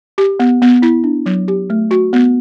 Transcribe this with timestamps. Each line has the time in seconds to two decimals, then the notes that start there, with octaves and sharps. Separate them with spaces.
0.18 G4
0.40 B3
0.62 B3
0.82 E4
1.04 D4
1.26 F#3
1.48 G4
1.70 A3
1.91 F#4
2.13 B3